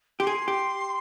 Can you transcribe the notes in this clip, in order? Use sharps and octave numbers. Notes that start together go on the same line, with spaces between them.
G4 C6
G#4
G4